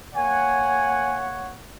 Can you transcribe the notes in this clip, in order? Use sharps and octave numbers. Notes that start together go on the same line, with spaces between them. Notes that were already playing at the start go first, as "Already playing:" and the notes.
A#3 C#5 F#5 G#5